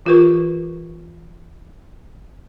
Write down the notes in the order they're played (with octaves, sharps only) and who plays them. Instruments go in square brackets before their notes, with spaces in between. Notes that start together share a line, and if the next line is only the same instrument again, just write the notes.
[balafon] E3 F4 G4 A#4 B4 C#6